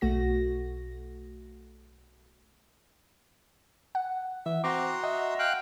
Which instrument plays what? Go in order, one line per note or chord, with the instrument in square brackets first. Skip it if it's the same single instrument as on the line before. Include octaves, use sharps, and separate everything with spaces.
[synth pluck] B1 A3 F#4 A#6
F#5
[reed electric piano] E3 [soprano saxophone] E5
[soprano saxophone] C4 [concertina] F#4 A#5 C6 [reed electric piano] D6
[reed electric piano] D#5 [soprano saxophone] E5 [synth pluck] F#5
[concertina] F5 G5 F#6